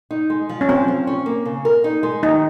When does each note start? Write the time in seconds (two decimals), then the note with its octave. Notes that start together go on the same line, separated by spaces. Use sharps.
0.11 D#4
0.30 G#3
0.49 F3
0.61 C#4
0.69 F3 C4
0.88 F3
1.07 C#4
1.26 A#3
1.45 C#3
1.65 A#4
1.84 D#4
2.03 G#3
2.23 D#2 D#4